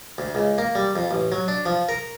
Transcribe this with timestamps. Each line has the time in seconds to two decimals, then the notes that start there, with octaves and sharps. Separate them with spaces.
0.18 D2
0.35 C#2
0.58 A#3
0.75 G3
0.96 F2
1.11 A1
1.32 F#3
1.48 D4
1.66 F3
1.89 A#4